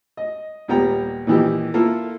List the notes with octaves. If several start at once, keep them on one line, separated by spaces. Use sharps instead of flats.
D#5
D#2 A#2 G3 B3 G5 A#5
A#2 D#3 E3 D#4 G4
A#3 E4 F4 A4